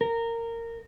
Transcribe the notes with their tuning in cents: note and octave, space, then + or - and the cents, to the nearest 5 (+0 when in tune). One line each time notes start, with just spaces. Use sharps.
A#4 -15